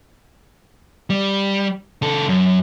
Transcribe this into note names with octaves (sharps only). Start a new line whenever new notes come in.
G3
C#3 A4
F#2